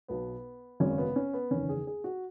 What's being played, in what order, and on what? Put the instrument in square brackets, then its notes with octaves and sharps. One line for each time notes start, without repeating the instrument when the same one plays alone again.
[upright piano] B1 B2 F#3 B3
G#1 F#2 C#3 G#3 C#4
B3
C#4
B3
F#1 E2 D#3 C#4
G#4
G#4
F#4